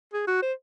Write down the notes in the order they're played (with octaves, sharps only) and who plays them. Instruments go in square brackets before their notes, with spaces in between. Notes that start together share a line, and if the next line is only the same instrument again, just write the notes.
[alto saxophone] G#4
F#4
C5